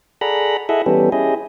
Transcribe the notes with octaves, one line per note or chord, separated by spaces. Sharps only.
G#4 A4 D5 F#5 A#5 B5
E4 G#4 A4 D#5 E5 F#5
E3 G3 B3 C#4 G4 A4
C#4 E4 G4 G#4 D#5